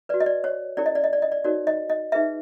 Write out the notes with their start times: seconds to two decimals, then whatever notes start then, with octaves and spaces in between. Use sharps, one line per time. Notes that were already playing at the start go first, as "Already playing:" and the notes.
0.09 F#4 B4 D5
0.20 D#5
0.26 D5
0.44 C#5
0.77 C#4 E4 G4 A#4 C#5 D5
0.86 D#5
0.95 D5
1.04 D#5
1.13 D5
1.22 D#5
1.32 D5
1.44 D#4 F#4 A#4 C#5 D5
1.67 D#5
1.89 D#5
2.12 D#4 G#4 B4 E5